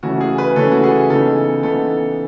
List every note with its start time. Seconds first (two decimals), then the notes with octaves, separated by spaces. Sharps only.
0.03 C#3 E3 A3 C#4 F#4
0.21 G#4
0.38 B4
0.56 C#3 E3 A3 C#4 A4
0.72 F#4
0.83 G#4
1.10 C#3 E3 B3 D#4 A4
1.63 C#3 E3 B3 D#4 A4